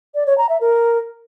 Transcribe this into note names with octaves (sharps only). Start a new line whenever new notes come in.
D5
C#5
A#5
E5
A#4